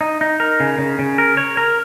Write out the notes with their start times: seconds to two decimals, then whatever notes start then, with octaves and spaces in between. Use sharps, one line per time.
0.01 D#4
0.21 D#4
0.40 A#4
0.60 C#3
0.79 C#3
0.99 C#3
1.18 A#4
1.37 C#5
1.57 A#4